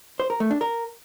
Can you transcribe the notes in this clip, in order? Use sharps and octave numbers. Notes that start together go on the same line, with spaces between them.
C5
A#4
A3
D4
A#4